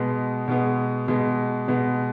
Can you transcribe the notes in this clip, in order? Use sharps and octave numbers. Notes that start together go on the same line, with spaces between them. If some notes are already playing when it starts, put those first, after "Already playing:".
Already playing: B2 G#3 B3
B2 G#3 B3
B2 G#3 B3
B2 G#3 B3